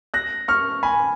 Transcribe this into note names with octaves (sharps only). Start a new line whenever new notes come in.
F#6 A#6
C#6 F6
G#5 B5